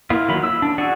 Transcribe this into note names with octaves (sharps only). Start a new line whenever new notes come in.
A#3 E4 F4
D#3 F#3 F4 B5
E6
D4
F#4 G#4 D5 F#5